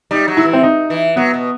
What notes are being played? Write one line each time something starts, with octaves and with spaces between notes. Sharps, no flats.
G3 D#4
F#3
E4
E3
C4
D#4
E3
F#3 B3
B2